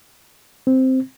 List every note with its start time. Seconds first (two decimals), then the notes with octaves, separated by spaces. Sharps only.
0.67 C4